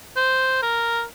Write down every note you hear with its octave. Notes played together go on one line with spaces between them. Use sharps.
C5
A#4